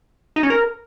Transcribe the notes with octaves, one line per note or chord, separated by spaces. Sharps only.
D#4
C#4
A#4